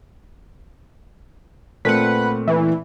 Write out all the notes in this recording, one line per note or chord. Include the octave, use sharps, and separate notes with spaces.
A#2 A3 C4 B4 F#5
E3